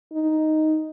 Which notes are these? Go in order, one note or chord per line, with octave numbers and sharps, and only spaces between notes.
D#4